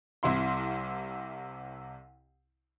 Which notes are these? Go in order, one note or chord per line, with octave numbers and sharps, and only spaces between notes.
C2 C3 E4 C6